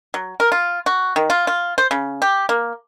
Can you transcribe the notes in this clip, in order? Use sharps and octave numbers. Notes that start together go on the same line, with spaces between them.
F#3
A#4
F4
F#4
D#3
F4
F4
C5
C#3
G4
A#3